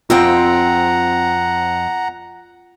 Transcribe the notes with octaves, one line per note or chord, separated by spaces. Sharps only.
F2 C4 F4 F#5 G5 A#5